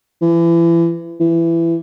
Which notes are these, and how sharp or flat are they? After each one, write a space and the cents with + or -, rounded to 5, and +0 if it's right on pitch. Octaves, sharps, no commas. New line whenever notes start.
E3 +30
E3 +20